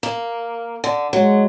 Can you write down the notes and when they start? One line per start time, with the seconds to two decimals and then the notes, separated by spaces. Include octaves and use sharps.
0.03 A#3
0.84 D3
1.13 F#3 G#3